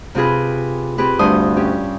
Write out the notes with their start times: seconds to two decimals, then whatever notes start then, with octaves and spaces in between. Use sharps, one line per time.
0.15 C3 C4 F4 G#4 B4
0.98 C4 G4 G#4 B4
1.19 D2 G2 C5 D#6
1.56 C#4 G4